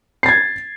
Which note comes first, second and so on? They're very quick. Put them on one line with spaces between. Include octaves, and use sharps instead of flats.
C7 A6 G#6